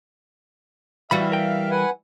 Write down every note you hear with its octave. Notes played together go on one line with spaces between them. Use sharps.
E3 G3 F#4 B4 E5 F5 B5
A#4 G5
B4 F#5 G#5